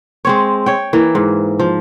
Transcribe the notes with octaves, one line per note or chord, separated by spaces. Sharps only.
G#3 C4 C#5
C#5 G5
E3 A#3
G#2
F3